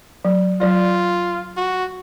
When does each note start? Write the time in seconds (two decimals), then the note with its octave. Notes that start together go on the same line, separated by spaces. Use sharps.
0.25 F#3
0.61 F#3 F4 D5
1.57 F#4